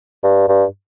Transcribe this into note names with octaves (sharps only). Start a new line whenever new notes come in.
G2
G2